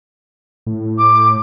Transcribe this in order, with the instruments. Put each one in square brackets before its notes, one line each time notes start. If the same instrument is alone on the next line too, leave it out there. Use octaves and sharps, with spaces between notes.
[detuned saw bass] A2
[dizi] D6